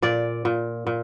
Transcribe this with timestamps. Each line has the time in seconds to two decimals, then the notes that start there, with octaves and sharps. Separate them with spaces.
0.02 A#2 D5
0.45 A#2
0.87 A#2